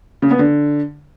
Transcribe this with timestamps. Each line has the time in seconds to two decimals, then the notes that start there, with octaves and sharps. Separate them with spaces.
0.22 C#3
0.31 B3
0.39 D3